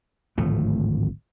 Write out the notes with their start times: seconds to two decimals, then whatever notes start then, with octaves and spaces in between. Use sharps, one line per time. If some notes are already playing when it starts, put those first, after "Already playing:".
0.38 D1 G#1 F3 A3